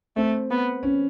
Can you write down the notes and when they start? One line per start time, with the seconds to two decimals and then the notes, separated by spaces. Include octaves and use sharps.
0.16 A3 C4
0.50 B3
0.83 C#4